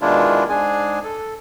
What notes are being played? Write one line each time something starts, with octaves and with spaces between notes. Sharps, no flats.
B2 D#3 G#3 D4 E4 F4
G#2 G#3 D4 G#4 G#5
A4